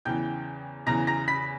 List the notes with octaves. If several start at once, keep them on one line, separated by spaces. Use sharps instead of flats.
E2 C#3 E3 G5 G6
E2 C#3 E3 A#5 A#6
A#5 A#6
B5 B6